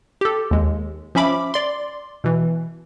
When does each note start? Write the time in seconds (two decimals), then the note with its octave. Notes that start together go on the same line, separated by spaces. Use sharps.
0.21 G4 A4
0.51 D#2 G#3
1.15 F3 C#4 E5 B5 D6
1.54 D5 C6
2.24 B2 E3